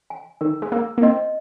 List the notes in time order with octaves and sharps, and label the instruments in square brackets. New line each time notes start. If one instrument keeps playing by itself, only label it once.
[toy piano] G#5
[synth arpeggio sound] D#3 [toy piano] A#4
[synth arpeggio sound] G#3
[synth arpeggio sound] A#3 [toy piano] A#4
[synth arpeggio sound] A#3
[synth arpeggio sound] C4 [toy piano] D#5